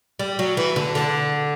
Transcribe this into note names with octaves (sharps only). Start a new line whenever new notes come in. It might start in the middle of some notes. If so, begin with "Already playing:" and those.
G3
F#3
E3
D3
D3